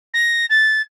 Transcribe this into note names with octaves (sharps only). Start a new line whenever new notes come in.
A#6
A6